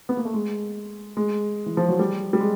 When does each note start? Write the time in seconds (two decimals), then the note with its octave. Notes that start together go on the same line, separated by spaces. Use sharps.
0.09 B3
0.17 A#3
0.25 A3
0.34 G#3
1.17 G#3
1.66 E3
1.77 F3
1.88 F#3
1.99 G3
2.33 G3
2.40 G#3